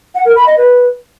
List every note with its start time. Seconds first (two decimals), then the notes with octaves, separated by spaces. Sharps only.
0.15 F#5
0.25 A#4
0.36 B5
0.46 D#5
0.57 B4